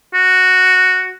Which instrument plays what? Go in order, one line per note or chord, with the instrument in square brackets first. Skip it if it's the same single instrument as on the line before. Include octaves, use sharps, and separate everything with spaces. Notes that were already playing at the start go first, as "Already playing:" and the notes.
[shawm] F#4